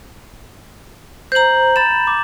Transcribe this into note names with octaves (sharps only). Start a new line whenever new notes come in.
C5 A#5 G6 F#7
A#5 B5 A6 E7
D6